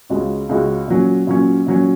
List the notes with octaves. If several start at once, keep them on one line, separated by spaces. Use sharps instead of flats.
C#2 C#3 G#3 F#4
C#2 C#3 G#3 F#4
A#2 F#3 C#4
A#2 F#3 C#4
A#2 F#3 C#4